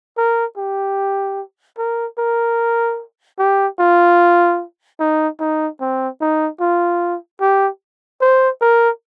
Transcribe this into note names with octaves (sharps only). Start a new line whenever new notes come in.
A#4
G4
A#4
A#4
G4
F4
D#4
D#4
C4
D#4
F4
G4
C5
A#4